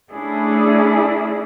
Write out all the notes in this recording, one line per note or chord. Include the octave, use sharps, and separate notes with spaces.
A3 C#4 D4 E4 G#4